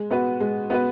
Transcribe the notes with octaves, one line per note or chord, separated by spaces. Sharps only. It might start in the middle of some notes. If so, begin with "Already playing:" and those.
Already playing: G#3
B3 F#4 B4
G#3
B3 F#4 B4